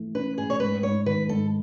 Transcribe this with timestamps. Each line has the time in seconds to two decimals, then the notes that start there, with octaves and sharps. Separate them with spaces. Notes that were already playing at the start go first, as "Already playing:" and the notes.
Already playing: E3 A3
0.15 C#4 B4
0.38 A2 G#4
0.50 C#5
0.60 G#2 B4
0.83 G#2 C#5
1.06 D#3 B4
1.29 G#2 A4